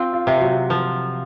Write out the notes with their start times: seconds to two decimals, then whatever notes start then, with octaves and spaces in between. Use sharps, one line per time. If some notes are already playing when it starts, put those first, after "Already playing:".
Already playing: C4 F4
0.13 F4
0.27 C3
0.41 F#3 F#4
0.70 F3